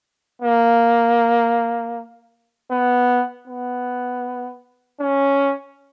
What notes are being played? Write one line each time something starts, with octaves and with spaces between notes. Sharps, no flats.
A#3
B3
B3
C#4